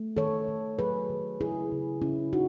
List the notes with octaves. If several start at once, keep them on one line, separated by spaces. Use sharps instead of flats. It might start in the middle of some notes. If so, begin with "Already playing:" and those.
Already playing: A3
D#3 A4 C#5
D#3
F#3 G#4 B4
D#3
C#3 E4 G#4
C#3
C#3 C#4 E4
D#4 F#4